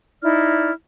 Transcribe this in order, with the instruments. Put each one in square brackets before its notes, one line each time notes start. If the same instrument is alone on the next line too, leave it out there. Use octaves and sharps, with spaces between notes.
[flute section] D#4 E4 D5 F6